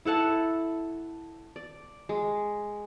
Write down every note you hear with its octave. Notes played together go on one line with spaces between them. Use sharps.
E4 A4 F#5 A5
D5
G#3